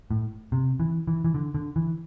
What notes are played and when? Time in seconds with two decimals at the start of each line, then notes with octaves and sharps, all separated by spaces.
0.11 A2
0.52 C3
0.80 E3
1.07 E3
1.25 E3
1.35 D3
1.54 D3
1.76 E3